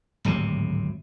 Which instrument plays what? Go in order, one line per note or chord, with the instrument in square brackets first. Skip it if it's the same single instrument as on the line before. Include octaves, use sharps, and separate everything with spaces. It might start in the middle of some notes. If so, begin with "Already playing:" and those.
[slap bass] D1 G#1 C3 F#3